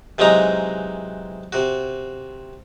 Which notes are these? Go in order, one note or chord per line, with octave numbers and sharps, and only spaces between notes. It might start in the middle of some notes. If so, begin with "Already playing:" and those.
C3 E3 F#3 G#3 D#4 A#5
C3 F#4